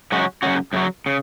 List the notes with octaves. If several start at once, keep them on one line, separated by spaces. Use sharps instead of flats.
F#2 C#3 G#3 C#4 F#4
F#2 C#3 G#3 C#4 F#4
F#2 C#3 F#3
C#3